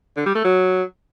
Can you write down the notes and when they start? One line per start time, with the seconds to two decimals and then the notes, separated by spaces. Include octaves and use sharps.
0.17 D3
0.26 G3
0.35 A3
0.44 F#3